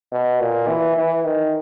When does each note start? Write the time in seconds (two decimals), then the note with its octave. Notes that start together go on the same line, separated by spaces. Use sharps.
0.12 B2
0.41 A#2
0.68 E3
0.97 E3
1.25 D#3